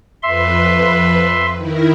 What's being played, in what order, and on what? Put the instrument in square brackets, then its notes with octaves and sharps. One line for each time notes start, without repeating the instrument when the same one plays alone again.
[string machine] F2 B4 [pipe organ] E5 C6
[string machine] D#3 E4 A#4